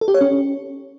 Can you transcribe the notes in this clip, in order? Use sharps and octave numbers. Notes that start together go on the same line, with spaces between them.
A4
G4
C#5
C#4